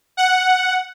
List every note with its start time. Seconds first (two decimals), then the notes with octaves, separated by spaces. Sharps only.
0.17 F#5